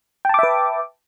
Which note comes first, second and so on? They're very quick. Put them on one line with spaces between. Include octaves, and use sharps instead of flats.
G5 A5 D6 E5 B4